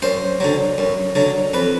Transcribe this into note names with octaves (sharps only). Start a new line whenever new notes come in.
F#2 C5
D3 F#3
F#2
D3 F#3
F2 B4